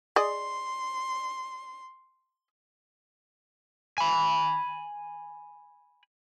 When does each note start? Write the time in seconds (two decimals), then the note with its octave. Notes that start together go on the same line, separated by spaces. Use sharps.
0.16 G#4 D5 D#5 C6
3.98 G#5 B5